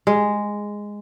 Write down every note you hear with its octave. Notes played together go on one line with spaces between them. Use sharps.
G#3